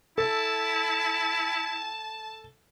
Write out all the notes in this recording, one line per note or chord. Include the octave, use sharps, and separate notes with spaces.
E4 A4 A5